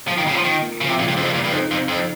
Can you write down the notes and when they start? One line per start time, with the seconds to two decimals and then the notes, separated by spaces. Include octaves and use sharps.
0.07 F3 A#3
0.18 D#3
0.26 C#3 F4
0.35 F3
0.44 D#3 A#3
0.62 A#3
0.81 C#3 F3
0.89 C3
0.99 A#2 C#3
1.08 G2
1.17 F2 C#3
1.25 G2
1.34 A#2 F3
1.44 G2
1.52 F2 D#4
1.71 F2 C3
1.88 F2 D#4